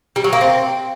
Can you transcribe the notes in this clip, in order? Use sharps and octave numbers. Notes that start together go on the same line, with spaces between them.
G3
F#3
A#3
C4